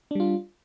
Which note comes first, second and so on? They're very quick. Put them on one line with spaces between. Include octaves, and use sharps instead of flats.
D4 G3 F4